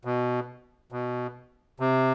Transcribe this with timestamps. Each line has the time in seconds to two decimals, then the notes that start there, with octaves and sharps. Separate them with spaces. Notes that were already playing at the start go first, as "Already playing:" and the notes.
0.05 B2
0.92 B2
1.80 C3